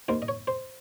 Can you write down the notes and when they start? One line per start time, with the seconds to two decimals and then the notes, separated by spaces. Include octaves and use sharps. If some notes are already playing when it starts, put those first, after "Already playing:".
0.08 D#2 D#3 A#3 C5
0.22 D#5
0.28 C#5
0.47 C5